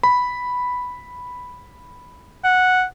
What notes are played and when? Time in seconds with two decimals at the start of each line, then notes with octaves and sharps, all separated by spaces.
0.03 B5
2.44 F#5